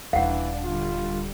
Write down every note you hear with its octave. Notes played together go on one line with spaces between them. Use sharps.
D#1 E3 D4 D#4 F5 F#5
D3 G3 F4